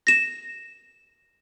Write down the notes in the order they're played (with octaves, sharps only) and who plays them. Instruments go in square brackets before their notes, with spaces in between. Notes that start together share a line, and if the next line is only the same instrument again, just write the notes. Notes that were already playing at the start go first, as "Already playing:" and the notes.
[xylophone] A#6 E7